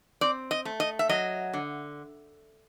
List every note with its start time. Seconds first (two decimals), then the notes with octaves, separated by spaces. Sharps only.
0.21 C4 D5
0.51 D#5
0.65 A3
0.80 D#5
0.99 E5
1.09 F#3 D#5
1.53 D3